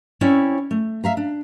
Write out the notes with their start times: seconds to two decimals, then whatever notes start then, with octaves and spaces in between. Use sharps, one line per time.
0.21 C4 C#4 E4 C#5 D5
0.71 A3
1.04 E5 F5 A#5
1.17 D4